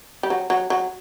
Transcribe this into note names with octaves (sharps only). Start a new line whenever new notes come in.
G3
F#3
F#3
F#3